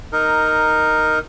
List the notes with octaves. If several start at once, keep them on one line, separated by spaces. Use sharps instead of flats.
D#4 A#4